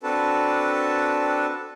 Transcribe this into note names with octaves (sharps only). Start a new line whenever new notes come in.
C4 D4 F#4 A4 B4 A5